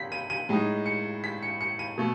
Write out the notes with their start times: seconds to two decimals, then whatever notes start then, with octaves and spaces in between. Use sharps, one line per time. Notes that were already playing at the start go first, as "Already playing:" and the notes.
Already playing: B6
0.12 D#7
0.30 D#7
0.49 A2 G#3 D#4
0.86 C#7
1.24 B6
1.43 C#7
1.61 C#7
1.79 D#7
1.98 B2 A3